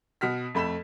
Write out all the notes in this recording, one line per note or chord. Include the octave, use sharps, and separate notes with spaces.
B2 F#4 F6 B6
F2 A3 B5 B6 E7